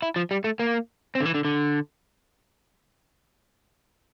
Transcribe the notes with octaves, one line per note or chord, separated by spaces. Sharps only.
E4
F3
G3
A3
A#3
C4
D3
E3
D3
D3